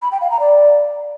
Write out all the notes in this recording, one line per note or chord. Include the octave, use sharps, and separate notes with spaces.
B5
G5
F5
A#5
D5